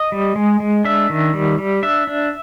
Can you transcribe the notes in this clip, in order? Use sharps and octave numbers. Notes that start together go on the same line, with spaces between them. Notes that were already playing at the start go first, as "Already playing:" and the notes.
Already playing: D#5
G3
G#3
G#3
D4 E5
D#3
G3
G3
D4 E5
D4